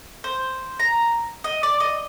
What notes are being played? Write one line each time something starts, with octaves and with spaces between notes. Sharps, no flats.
C5
A#5
D#5
D5
D#5